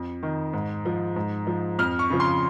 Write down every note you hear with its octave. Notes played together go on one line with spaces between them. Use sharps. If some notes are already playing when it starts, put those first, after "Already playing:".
Already playing: F2
D#3
G#2
F3
G#2
F3
F2 F6
C#6
C#3 F3
C6